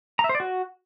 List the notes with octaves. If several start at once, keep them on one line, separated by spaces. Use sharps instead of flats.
A#5
E5
C5
D5
F#4